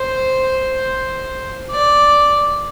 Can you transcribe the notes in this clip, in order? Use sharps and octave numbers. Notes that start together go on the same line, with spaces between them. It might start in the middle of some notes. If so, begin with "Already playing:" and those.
Already playing: C5
D5